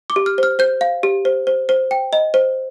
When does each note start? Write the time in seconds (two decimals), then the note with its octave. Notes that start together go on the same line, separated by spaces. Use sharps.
0.10 D6
0.16 G4
0.26 F6
0.38 C5 F6
0.59 C5 G6
0.81 F5
1.03 G4
1.25 C5
1.47 C5
1.69 C5
1.91 G5
2.13 D#5
2.34 C5